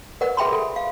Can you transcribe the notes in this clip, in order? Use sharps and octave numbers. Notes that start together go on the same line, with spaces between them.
A#4 B4 D5 F#5
G#4 E5 G5 B5 C6
A4
F5